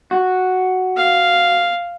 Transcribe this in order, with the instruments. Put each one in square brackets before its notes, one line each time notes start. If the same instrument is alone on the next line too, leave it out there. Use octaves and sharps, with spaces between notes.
[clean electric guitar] F#4
[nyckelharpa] F5